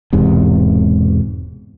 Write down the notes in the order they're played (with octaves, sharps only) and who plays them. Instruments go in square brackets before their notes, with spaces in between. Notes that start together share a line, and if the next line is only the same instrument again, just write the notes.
[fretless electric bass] E1 E2 G#2 C3